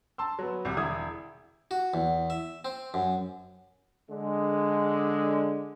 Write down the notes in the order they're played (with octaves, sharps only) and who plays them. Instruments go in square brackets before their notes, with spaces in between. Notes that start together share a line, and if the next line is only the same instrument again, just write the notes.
[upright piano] A5 C6 E6
F#3 B3
C2 C3
E1 E4 D#6 G#6
[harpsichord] F#4
E2
E5
C4
F#2
[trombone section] D3 G#3